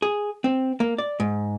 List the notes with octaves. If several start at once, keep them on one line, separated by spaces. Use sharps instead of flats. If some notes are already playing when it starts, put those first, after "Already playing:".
G#4
C4
A#3
D5
G#2